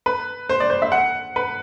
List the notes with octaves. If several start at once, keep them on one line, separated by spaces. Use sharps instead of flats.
B4
C5
D5
C5
E5
F#5
B4